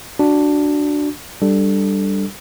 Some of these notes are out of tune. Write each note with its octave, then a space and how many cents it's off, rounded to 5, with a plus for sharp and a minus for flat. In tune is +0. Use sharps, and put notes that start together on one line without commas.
D4 +0 F#4 +0
G3 +0 D4 +0 A4 +0